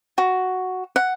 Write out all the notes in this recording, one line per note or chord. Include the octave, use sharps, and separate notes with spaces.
F#4
F#5